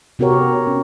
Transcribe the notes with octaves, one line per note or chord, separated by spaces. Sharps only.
C3 B3 F#4 G4 A#4 C#5
C#4